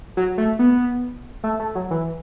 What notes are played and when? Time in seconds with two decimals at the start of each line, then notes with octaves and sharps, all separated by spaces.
0.17 F#3
0.38 A3
0.59 B3
1.44 A3
1.59 A3
1.75 F#3
1.91 E3